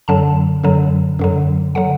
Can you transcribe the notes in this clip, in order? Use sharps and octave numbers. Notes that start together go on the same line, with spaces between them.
F#2 D3 F#3 A5
F#2 D3 F#3
F#2 D3 F#3
D3 F#3 F#5